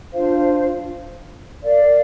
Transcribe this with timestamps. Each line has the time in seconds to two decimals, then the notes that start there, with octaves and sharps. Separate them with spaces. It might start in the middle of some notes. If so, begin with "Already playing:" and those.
0.13 D4 F4 C5 F5
1.62 A#4 D5 F5